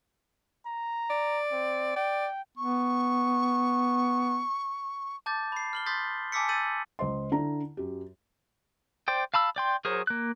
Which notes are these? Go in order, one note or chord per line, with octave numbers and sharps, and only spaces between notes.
A#5
D5
C4
D5 G5
B3 C#6
A5 D6 G6 A6
B5 C7
F6 F#7 G7
C6 D#6 G6 A6 B6
G#5 A5 D6 E6 B6 C#7
E6 G6 A6 D#7 F#7
C#2 C5 D#5 C6
D3 E4 A#5
F#2 G4
C5 D5 G5
F5 A5 B5 E6
D5 G5 C6
F#3 G#4 A#4 C5 C#5
A#3 F#6